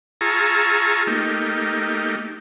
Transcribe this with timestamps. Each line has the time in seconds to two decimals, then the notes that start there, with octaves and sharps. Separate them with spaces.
0.21 F4 G#4 A5 A#5 C#6 E6
1.07 A3 A#3 D#4 G4